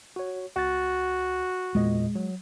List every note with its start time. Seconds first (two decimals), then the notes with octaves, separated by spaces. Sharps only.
0.16 F#4 C#5
0.56 C#2 F#4 A6
1.75 E2 A#2 G#3 D#5
2.15 F#3